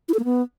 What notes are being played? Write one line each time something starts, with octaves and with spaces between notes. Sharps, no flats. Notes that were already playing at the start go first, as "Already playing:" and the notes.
E4
A4
A#3
B3